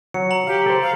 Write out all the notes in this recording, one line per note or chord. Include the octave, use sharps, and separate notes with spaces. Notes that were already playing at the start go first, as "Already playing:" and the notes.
F#3 C#7
A#5 F#7
G4 F5
A4 C5
F5